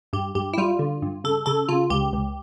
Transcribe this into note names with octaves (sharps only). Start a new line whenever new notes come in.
G2 G4
G2 G4
E4
G3 F4
D3
G2
C#3 A4
C#3 A4
C#3 F4
C#2 G4
C#2